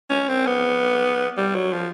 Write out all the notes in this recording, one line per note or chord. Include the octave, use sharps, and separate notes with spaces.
C#4
C4
B3
G3
F#3
F3